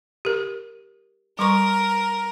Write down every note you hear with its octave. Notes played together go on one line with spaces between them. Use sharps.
G4 A#4
G3 A#4 C6 C#6